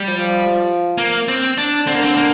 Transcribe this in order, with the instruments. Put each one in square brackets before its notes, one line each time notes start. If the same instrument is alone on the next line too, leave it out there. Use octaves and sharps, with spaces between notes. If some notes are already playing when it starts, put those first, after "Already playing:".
Already playing: [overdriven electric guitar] G3
[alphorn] F3
[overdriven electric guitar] A#3
C4
D4
[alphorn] D3 [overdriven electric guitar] C4
[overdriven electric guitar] A#3
C4
A#3